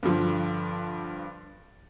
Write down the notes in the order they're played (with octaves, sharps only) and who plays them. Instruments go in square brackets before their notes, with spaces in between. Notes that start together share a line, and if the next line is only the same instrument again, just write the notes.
[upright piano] G2 D3 F3